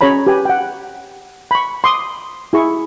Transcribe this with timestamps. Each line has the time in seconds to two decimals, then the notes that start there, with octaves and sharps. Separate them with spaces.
0.01 C#4 G#4 C#5 A#5 B5
0.27 G4 B4 G#5
0.45 F#5 G5
1.51 B5 C#6
1.84 C6 D6 D#6
2.53 E4 G#4 C#6